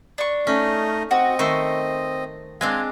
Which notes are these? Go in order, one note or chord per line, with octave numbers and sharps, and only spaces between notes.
D4 C#6
A3 C#4 D#4 D#5
C4 F#4 D#5
D#3 A3 C5 C#6
G#3 C4 D4 F5 G#5